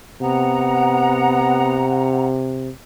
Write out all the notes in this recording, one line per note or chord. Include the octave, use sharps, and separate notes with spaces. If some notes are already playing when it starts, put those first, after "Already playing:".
C3 B3 F#5 A#5